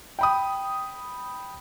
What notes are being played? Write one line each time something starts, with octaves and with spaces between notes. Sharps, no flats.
G5 B5 D#6